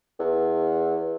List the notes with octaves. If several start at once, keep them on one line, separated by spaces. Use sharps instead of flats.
E2